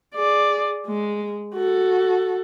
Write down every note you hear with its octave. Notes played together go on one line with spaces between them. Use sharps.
G#4 D5
G#3
F#4 A4